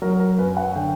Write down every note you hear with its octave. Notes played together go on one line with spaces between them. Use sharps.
F#3 A#4
A#4
F#2 B4
F#5
D3 G5